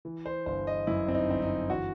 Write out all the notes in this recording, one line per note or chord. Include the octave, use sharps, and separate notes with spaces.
E3
C5
G1 C5
D#5
F#2 E4
C4
D#4
G1 C4
D#4
E3 F#4